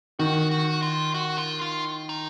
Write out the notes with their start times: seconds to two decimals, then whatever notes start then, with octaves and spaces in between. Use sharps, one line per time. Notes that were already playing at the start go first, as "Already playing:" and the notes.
0.19 D#3 F#4
0.51 F#4
0.82 F4
1.14 F#4
1.38 F4
1.62 F4
2.09 D#4